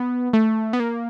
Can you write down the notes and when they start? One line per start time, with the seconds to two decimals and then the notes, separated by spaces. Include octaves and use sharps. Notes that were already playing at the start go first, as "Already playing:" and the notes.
Already playing: B3
0.33 A3
0.73 B3
0.80 A#3